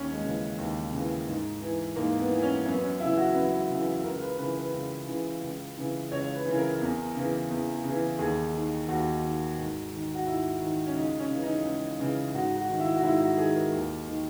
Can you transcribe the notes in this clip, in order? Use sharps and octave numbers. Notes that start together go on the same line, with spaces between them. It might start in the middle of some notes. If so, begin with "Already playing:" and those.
Already playing: D#2 C#4
G#3
C#3 E3
D#2
C#3
E3
G#2
E3
G#2 A#3
B3
E3
C#4
F#2 B3
C#4
C#3 E3 E4
F#4
F#2 B4
C#3 E3
C#2 A#4
B4
C#3 E3 B4
B4
C#2
C#3 E3
C#2
C#3 E3
C#2 C#5
B4
C#3 E3
A#4
E2
C#3 E3
E2
C#3 E3
D#2 G#4
D#3
D#2 F#4
D#3
G#2
D#3
F#4
G#2 E4
D#3
C#4
C#2 D#4
C#4
C#3 E3
D#4
C#2
C#3 E3
G#2 F#4
F#4
D#3
E4
F#4
G#2 E4
F#4
D#3 G#4
A#4
D#2
D#3